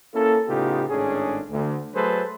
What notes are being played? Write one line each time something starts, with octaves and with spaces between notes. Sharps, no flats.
A#3 C#4 E4 A4
A2 C#3 B3 D#4 F4 G4
G#1 A2 C#4 D4 G#4
D2
F#3 A3 G#4 A4 B4 C5